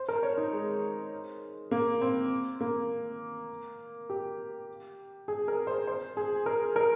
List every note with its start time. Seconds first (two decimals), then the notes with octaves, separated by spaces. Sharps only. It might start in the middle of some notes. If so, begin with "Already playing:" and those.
Already playing: C5
0.09 A#4
0.23 C#5
0.38 D#4
0.53 G#3
1.71 A#3
2.01 C4
2.61 A#3
4.10 G4
5.28 G#4
5.48 A#4
5.67 C5
5.87 C5
6.17 G#4
6.46 A#4
6.76 A#4